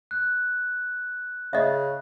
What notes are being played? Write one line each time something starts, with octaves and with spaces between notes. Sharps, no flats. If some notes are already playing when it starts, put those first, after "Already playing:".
F#6
C#3 D#5 E5